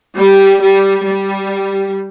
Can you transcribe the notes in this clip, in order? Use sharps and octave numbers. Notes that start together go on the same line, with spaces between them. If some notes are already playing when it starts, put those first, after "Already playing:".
G3
G3
G3